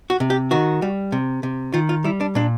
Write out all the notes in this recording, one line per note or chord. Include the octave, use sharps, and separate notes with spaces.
F#4
C3
G4
D#3 F#4
G3
C3
C3
D#3 F4
F4
G3 E4
D4
A#2 D4